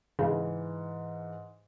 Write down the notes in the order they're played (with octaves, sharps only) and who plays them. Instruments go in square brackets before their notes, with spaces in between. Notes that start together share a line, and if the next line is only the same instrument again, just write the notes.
[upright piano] G#2 E3 [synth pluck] C#3